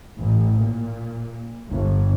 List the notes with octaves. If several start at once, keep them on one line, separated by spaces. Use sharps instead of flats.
A1
A#2
G1